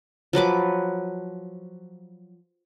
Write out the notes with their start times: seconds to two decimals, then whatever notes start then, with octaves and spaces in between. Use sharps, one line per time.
0.33 F3 F#3 B4 D6